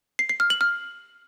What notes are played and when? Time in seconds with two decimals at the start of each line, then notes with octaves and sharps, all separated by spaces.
0.19 C7
0.29 C7
0.40 F6
0.50 F#7
0.61 F6